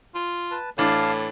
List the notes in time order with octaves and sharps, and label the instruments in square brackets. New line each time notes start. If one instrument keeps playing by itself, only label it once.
[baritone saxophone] F4
[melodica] B4 A5
[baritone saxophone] A2 [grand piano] E3 D4 [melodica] F5 A5